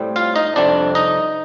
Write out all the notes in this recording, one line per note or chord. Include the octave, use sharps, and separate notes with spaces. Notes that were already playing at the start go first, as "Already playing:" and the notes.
Already playing: A2 G3 C4
F4 F5
D#4 D#5
F2 C3 G3 C4 D4 D5
D#4 D#5